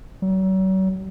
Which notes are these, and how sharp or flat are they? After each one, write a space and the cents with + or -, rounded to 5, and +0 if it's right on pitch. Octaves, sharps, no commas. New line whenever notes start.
F#3 +40